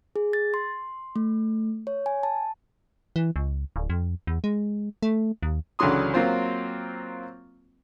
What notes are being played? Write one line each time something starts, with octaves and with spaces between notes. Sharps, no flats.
G#4
A6
C6
A3
C#5
G#5
A5
E3
C#2
D1
F2
E2
G#3
A3
D#2
C#2 D3 E3 F#3 C6 D#6
F#3 A#3 C4 F4 C5